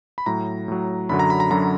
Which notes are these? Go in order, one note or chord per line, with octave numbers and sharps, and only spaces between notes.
B5
A2 F#3 A#5
A2 F#3
F#2 D3 F#3 B5
A#5
B5
A#5
F#2 D3 F#3 A#5